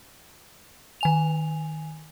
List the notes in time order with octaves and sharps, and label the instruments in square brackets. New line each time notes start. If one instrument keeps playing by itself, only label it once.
[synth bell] D#3 G#5 F7